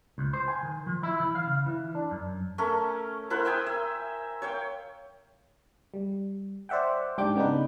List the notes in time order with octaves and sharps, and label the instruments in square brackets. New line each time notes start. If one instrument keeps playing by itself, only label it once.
[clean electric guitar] C#2
C5
G#5
D#3
F3
E4
E3
F5
C#3
E3
D4
F#2
[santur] A3 C#4 A#4
E4 A#4 C5 F#5
E5 G5 G#5 D#6
E5
C#5 F5 G5
[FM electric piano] G3
C5 D5 E5 F#5 G5
G#2 D4 G4 G5 D6 G6
C#3 B3 D4 D#4 B4